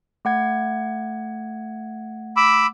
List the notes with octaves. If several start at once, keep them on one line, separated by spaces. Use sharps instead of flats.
A3 F#5 G#6
B5 D6 E6